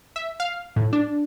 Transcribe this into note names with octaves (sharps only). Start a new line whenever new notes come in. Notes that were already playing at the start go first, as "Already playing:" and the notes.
E5
F5
A2
D4